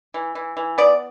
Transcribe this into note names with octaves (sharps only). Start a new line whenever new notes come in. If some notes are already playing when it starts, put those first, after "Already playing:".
E3
E3
E3
B3 D5